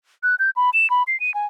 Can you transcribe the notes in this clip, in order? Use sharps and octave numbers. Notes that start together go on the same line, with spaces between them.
F#6
G6
B5
E7
B5
C7
D#7
G#5